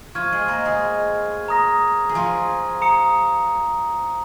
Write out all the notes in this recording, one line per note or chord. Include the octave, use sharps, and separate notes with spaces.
F3 F4 C#6 F6 G#6 D#7
G#3 G#4
A#3 A#4
G#3 G#4
A#5 D#6 A#6
G#4
F3 F4
A#5 D#6 C#7